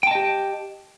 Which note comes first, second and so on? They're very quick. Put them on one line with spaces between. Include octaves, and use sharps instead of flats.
G5 A5 D#5 G4